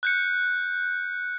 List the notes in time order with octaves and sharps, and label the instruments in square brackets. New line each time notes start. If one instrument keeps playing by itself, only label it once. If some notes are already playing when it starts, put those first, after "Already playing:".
[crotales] F#6 G6 C#7